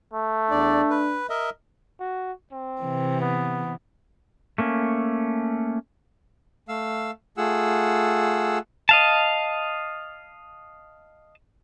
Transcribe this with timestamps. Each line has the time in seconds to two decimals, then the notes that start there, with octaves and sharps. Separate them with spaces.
0.13 A3
0.51 E2 D4 D5
0.90 B4
1.29 A#4 D#5 E5
2.00 F#4
2.52 C4
2.82 C3 E3
3.21 B3
4.58 A3 A#3 C#4
6.68 A3 F5 E6
7.37 A3 F4 G#4 F#5 E6
8.89 D#5 F5 A5